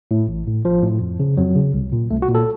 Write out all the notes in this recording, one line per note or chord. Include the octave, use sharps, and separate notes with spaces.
A2
A1
A2
A1 F3
A2
F2
C#3
F2 F#3
C#3
C2
A#2
C2 A3
F#4
A#2
A4